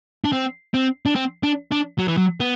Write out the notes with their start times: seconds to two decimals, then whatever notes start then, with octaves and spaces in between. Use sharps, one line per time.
0.25 D4
0.33 C4
0.74 C4
1.06 D4
1.15 C4
1.43 D4
1.71 D4
1.98 F#3
2.08 E3
2.17 F#3
2.40 B3